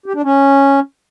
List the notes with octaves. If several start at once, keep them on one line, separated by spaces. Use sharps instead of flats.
G4
D4
C#4